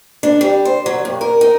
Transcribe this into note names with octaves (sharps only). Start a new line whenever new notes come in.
D4
G3
C5
F#3
G2
A#4
D#4